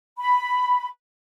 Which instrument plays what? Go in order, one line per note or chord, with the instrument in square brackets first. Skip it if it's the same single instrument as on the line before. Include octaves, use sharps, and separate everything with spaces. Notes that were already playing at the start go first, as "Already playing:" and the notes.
[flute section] B5